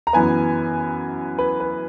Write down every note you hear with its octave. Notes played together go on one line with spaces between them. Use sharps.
A#5
F#2 E3 B3 G#5
B4
B4